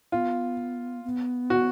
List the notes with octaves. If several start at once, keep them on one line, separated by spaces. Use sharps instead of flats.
B3 F4
B3
F#4